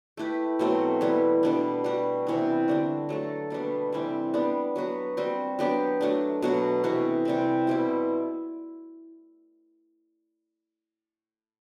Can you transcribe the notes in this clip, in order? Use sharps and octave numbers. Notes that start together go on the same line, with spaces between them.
A3 E4 G4 B4
B2 F#3 A3 C4
E3 G3 B3
B2 G3 B3 D4
G3 D4 F#4
C3 E3 B3
D3 G3 D4 F#4
F#3 A3 D4 A4
B2 G3 B3 D4
C3 E3 G3 C4
G3 B3 D4
F#3 B3 F#4 B4
G3 C4 F#4
F#3 B3 D4 G4
F#3 A3 D4
B2 F#3 B3 F#4
C3 E3 B3 F#4
C3 E3 G3 C4
B2 G3 C4 E4